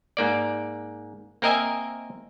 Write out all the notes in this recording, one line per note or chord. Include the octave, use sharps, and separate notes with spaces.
G#2 A#3 D5
A#3 C4 A#4 D#5 E5 G#5